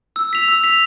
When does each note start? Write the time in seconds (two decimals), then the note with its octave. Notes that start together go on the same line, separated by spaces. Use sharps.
0.16 E6
0.33 B6 F7
0.48 E6
0.64 B6 F7